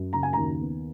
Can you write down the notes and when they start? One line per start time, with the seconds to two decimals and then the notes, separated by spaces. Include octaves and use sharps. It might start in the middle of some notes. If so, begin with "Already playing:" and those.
Already playing: F#2
0.13 C#3 A#5
0.23 G#5
0.33 D#2 A#5
0.60 B3